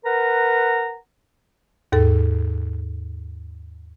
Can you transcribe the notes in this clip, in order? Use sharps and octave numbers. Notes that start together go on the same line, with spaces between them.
A#4 B4 F#5 A#5
D#2 G#2 A4